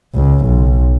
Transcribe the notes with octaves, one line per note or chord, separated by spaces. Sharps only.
C#2
B1